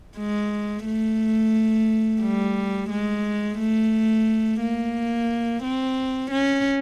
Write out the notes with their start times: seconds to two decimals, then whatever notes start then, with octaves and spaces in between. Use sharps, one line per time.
0.18 G#3
0.86 A3
2.22 G3
2.90 G#3
3.59 A3
4.61 A#3
5.63 C4
6.31 C#4